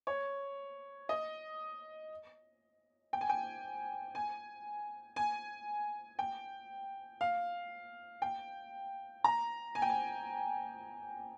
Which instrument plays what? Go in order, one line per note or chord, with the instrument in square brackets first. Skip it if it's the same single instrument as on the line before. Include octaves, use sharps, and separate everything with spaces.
[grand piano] C#5
D#5
G5
G#5
G5
G#5
G#5
G5
F5
G5
A#5
G#5
G5
G#5